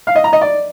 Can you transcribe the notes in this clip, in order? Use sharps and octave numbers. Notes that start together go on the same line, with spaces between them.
F5
D#5
A#5
D#5
D5